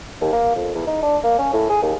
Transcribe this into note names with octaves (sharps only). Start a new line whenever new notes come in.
D#2
A#3
F2
E2
D#4
D4
A#3
C#4
A2
G#4
D#2